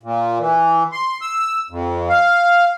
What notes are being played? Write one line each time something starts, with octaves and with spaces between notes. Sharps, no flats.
A#2
E3
C6
E6
F2
F5